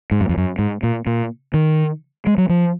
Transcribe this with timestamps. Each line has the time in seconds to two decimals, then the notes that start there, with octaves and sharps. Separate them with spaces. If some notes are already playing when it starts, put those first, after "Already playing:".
0.11 G#2
0.21 F#2
0.29 F2
0.37 F#2
0.59 G#2
0.83 A#2
1.07 A#2
1.54 D#3
2.27 G#3
2.38 F#3
2.49 F3